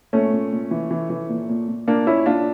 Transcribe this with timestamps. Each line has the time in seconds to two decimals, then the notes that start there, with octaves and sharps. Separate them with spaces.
0.13 A#2 A3 C#4
0.32 A#2
0.52 A#2
0.71 E3
0.91 E3
1.10 E3
1.29 A#2
1.49 A#2
1.68 A#2
1.87 A#2 A#3 D4
2.06 A#2 C#4 E4
2.26 A#2 D4 F4